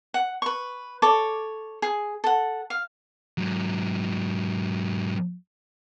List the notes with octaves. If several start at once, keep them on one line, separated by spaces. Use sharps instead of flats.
F#5
B4 C#6
A4 C#5 D6
G#4
A4 F#5
F5
G#2 F#3